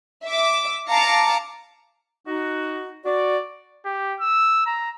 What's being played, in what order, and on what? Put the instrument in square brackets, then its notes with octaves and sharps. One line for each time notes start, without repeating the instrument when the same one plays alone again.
[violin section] E5 D6
F5 A5 A#5 D6 C#7
[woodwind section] D#4 F#4
F#4 D5
[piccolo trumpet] G4
E6
A#5